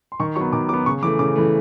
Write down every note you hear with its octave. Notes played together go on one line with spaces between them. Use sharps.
C6
D#3 C#6
F#3 B3 C#6
D#3 D6
F#3 B3 D6
C#3 C#6
E3 A3 D6
C#3 D6
E3 A3